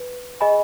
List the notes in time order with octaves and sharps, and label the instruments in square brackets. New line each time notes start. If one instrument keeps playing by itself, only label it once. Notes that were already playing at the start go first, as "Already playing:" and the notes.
Already playing: [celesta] B4
G#4 D#5 G#5 B5